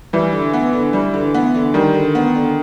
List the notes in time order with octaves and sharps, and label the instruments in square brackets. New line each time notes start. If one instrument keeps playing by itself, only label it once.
[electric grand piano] E3 [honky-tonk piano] G3
[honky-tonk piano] D3
B3
D3
G3
D3
B3
D3
[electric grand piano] D#3 [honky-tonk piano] G3
[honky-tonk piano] D3
B3
D3